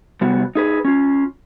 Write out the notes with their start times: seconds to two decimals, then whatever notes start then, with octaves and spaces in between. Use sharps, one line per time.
0.21 C3 G3 B3 F#4
0.55 D#4 G#4 B4
0.85 C#4 F4